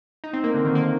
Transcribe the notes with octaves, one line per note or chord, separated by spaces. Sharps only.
D#4
C4
A#3
D3
D#3
A#3